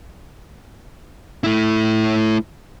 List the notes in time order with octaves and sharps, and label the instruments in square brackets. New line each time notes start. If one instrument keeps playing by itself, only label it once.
[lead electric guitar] A3 E4